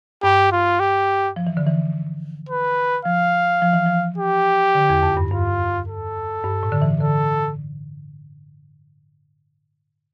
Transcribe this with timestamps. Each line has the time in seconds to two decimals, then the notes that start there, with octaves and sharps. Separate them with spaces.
0.23 G2 G4
0.52 F4
0.80 G4
1.36 F3
1.47 E3
1.57 D3
1.67 E3
2.49 B4
3.05 F3 F5
3.62 F3
3.73 E3
3.86 F3
4.18 G4
4.75 D3
4.89 E2
5.03 F2
5.17 G2
5.31 G2 F4
5.87 A4
6.44 G2
6.63 A2
6.72 D3
6.82 E3
7.00 D3 A4